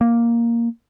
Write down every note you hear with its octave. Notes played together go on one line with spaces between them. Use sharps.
A#3